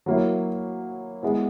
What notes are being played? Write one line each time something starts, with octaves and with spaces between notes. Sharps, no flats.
F#3 A#3 E4
G#3 B3 E4